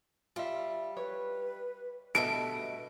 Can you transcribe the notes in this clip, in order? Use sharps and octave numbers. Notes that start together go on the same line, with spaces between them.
G3 F4 E5
B4 C#5
G2 B2 A3 A4 D#5 E5 A5 D7